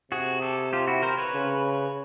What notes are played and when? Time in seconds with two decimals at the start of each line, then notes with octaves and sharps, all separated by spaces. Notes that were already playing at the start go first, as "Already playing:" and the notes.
0.12 C3 F#4 G#4
0.42 G4 A4
0.73 F4 G4
0.88 E4 F#4
1.02 A#4 C5
1.18 B4 C#5
1.33 C#3